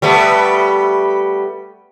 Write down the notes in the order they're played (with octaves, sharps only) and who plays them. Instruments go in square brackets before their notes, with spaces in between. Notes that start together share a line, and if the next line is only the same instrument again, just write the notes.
[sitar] G3 A3 B3